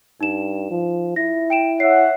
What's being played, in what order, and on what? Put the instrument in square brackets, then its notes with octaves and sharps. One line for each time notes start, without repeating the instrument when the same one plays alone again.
[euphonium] G2 [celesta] D#4 E7
[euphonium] F3
[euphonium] E4 [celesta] A#6
[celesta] G5 D7 E7
[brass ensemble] C#5 E5 F#5 [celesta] C7